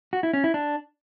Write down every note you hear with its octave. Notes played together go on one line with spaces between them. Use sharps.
F#4
E4
C#4
E4
D4